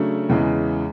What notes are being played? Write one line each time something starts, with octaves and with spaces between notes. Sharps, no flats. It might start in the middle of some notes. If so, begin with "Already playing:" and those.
Already playing: C#3 F#3 A3 D4
E2 C#3 E3 G#3